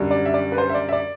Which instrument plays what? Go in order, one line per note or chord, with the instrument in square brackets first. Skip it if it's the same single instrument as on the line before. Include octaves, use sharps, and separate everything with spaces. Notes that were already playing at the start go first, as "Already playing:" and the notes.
Already playing: [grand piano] F#2 D3 G3
D5
E5
D5
B4
C5
E5
D5
E5
D5